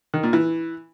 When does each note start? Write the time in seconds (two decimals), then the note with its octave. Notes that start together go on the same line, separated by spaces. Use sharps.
0.14 D#3
0.23 A#2
0.33 E3